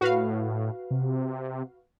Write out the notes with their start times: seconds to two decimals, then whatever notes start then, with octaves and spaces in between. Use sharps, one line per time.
0.01 A2 F#4 B4 F5
0.91 C3